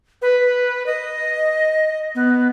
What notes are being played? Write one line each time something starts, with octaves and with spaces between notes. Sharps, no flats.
B4
D#5
B3